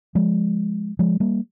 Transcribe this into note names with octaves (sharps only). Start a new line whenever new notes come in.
F3 G#3
F3 G#3
G3 A#3